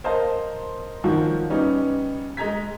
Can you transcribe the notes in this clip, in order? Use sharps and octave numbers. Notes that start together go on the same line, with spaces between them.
A#4 C5 D#5 F5 A5
D#3 F3 F#3 F#4
G3 B3 C#4 D#4
G#3 D#5 A#5 G#6 B6